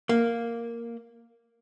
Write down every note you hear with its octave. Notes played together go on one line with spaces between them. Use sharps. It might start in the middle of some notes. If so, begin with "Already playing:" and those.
A#3